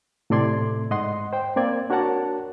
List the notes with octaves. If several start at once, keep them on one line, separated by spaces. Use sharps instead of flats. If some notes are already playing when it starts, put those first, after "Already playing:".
A2 C3 A4 D5 C6 G#6
G#2 D#5 F#5 C6
C5 G5
A#3 C4 D5 G#6
D4 F#4 A#4 C#5 F#5 A5